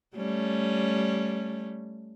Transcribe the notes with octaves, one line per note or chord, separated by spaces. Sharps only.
G3 A3 C#4